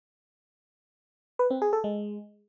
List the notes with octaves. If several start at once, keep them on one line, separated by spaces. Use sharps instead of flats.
B4
C4
G#4
A4
G#3